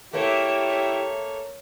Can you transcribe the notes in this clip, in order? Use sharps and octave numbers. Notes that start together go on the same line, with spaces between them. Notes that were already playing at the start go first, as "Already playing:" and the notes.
A3 A#3 E4 G4 C#5 E5